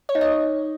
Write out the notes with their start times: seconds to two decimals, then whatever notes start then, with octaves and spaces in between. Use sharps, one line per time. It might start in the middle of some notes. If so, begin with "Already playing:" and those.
0.09 C#5
0.15 D#4
0.21 D#5